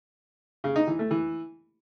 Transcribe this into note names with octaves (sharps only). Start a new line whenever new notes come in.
C#3
D#4
E3
A3
E3